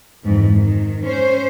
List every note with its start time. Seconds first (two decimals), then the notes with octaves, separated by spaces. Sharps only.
0.23 F2 G#2 E3
0.57 D#3
1.05 C#4 C5